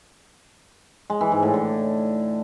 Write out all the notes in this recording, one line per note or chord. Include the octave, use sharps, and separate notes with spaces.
G#3
E3
G#2
A2
D3